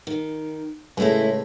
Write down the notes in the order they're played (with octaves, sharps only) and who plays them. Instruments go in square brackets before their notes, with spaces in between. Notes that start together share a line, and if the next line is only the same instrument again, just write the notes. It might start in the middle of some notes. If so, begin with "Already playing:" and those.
[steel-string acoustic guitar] D#3
[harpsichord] C#2 A2 [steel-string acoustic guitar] G#3 A3 E4